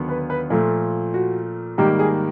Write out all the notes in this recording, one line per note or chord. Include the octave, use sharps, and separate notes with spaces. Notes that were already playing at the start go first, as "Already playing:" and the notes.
Already playing: D#2 D3 F#3 B3
B4
B4
A#2 F3 A3 A4
F#4
G#2 D#3 G3 A#3 G4
G#4